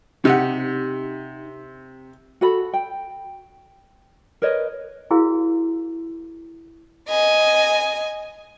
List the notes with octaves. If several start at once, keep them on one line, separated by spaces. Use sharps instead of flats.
C3 D#4 G4 F#5
F#4 A4 B5
G5
A#4 B4 C#5 D#5
E4 F#4 G#4 A#4 F5
D#5 G#5